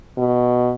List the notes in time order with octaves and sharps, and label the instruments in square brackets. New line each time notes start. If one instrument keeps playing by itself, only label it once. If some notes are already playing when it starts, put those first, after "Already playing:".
[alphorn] B2